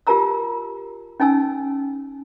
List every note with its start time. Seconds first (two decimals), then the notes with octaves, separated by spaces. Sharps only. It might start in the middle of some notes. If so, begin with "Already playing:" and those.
0.07 F4 G4 A#4 A5 A#5 E6
1.20 C#4 D#4 G#5 A5 E6